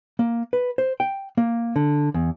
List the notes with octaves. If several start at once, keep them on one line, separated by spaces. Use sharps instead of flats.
A#3
B4
C5
G5
A#3
D3
E2